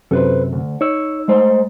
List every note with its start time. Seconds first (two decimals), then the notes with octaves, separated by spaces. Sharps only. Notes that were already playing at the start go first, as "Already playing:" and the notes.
0.11 F#2 C3 A4 B4 C5
0.53 D2
0.81 D#4 C#5 E6
1.28 G#3 A3 C5